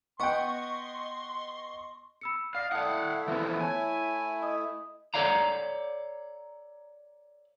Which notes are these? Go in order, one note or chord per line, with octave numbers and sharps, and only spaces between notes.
B3 D#5 F#5 G5 C6 C#6
B5 E6 C#7
D5 D#5 F5 F6 C7
A3 E4 D5 F5 F#5 A5 D#6
E3 F3 B3
C#5 G#5 A5
D#5 D#6
A4 A#4 C#5 D5 F5 A#5